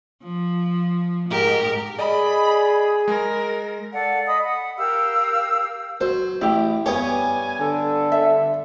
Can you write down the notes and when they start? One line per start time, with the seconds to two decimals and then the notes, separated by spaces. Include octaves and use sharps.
0.22 F3
1.30 G#2 G4 A#4
1.99 G#4 D5 D#5 B5
3.08 G#3 A#4
3.93 A4 D5 F5 F#5
4.26 D#5 B5 D#6
4.43 F#5
4.77 G4 A#4 F5 E6
6.01 F#3 C5
6.41 A1 E4 G4
6.86 G2 B3 G4 C#5 G#5
7.59 D3 A4
8.12 E5